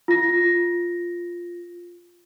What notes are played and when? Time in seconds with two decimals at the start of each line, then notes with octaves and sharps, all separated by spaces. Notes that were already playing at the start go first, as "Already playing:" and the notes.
0.08 F4 A#6